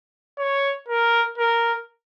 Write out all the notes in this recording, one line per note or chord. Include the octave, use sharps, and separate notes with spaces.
C#5
A#4
A#4